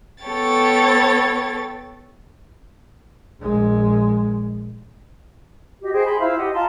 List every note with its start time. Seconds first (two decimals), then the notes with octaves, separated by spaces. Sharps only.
0.25 B3 A4 C#5 G5 A6
3.41 A#1 G#3
5.81 F#4 G4 D#5
5.93 G#4 C5 D#5 G5
6.05 G#4 B5 C6
6.19 E4 F4 C5 F5
6.37 G4 D#5 F#5
6.53 F4 A5 A#5 C6